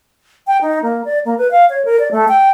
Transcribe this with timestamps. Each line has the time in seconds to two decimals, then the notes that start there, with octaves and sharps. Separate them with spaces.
0.47 G5
0.61 D#4
0.82 A#3
1.05 D5
1.25 A#3
1.38 B4
1.51 F5
1.70 C#5
1.85 A#4
1.99 D5
2.11 A3
2.28 G5